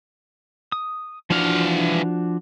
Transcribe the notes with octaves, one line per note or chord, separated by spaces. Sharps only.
D#6
E3 F3 D4 F#4 F5